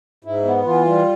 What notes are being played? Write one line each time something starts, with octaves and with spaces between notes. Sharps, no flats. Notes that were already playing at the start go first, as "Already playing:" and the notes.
G#2 E4
B3
E3 F4
G3